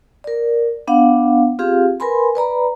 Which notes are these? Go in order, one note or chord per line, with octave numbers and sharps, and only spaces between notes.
A#4 D5
B3 D4 F5 F#5
C4 F4 G4 G#4 F5
A#4 B4 G#5 B5 C6
B4 D5 A#5 B5